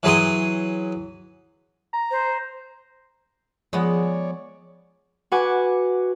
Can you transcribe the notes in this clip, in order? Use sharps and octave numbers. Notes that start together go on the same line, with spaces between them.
E3 F#3 G#4 C6 D#6
A#5
C5
F3 G#3 B3 C#5 D5
F#4 B4 F#5 G#5 D6